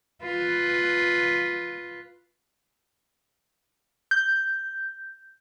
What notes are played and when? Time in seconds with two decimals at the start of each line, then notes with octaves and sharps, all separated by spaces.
0.23 F4 B4
4.11 G6